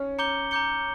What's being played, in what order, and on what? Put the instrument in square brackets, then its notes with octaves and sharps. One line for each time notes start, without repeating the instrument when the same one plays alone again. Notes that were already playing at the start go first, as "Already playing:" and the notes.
Already playing: [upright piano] C#4
[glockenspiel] A#5 D6 G6 C#7 G7
A#5 D6 G6 C#7 G7